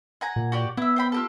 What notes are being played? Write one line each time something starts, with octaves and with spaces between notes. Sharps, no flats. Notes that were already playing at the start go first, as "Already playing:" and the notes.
F#5 G#5 A#5
A#2
F#4 G4 D5
B3 E4 E5
C5 G5 B5
F4 G4 A4